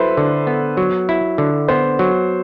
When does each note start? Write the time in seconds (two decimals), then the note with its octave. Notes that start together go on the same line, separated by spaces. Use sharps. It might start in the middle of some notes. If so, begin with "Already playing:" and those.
Already playing: F#3 E4 A4 B4 C5
0.17 D3
0.47 B3
0.77 F#3
1.09 E4
1.38 D3
1.68 B3 C5
1.99 F#3